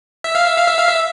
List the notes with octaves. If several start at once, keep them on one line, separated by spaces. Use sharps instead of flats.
E5
F5
E5
F5
E5
F5
E5